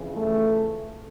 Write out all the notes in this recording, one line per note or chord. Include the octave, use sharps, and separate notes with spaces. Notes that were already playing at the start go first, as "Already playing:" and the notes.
Already playing: F2 C#3 E3
A3